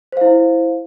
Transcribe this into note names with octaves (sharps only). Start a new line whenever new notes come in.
E4 C5 F5